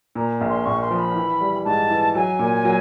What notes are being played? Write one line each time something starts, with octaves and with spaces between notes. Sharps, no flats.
A#2 A#5
A#1
C6
A#1 C#6
C6
F3
B5
E3
G3
G#2 A5
E3
F#3 G#5
A#2
F#3